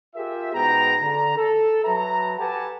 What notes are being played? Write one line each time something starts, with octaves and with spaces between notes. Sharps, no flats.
F4 G4 G#4 A#4 E5
G#2 B3 F#4 G#4 G5 A#5
D3 A#5
A4
F#3 B4 E5 A5 A#5
G4 A4 B4 F#5 G#5 A5